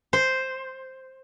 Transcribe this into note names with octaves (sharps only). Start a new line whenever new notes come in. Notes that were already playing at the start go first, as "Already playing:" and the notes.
C5